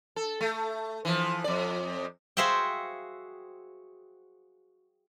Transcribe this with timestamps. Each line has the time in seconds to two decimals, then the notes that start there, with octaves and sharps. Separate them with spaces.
0.16 A4
0.41 A3
1.05 E3 F3
1.44 F2 D5
2.37 F#4 G#4 C5 E5 F5 G5